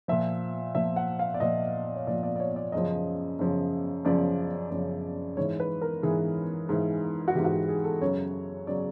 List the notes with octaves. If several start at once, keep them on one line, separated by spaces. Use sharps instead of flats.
A#2 F3 E5
A#2 F3 E5
F#5
F5
D5
A#2 F3 D#5
C#5
A#2 F3 D5
D5
D5
C#5
D5
F#2 C#3 F3 D#5
F#2 C#3 F3
F#2 C#3 F3 D5
F#2 C#3 F3
G#2 E3 C#5
B4
A#4
G#2 E3 G#4
G#2 E3
F#4
G#2 E3 G4
F#4
G4
G#4
A4
F#2 C#3 F#3 C#5
C#3 F#3 D5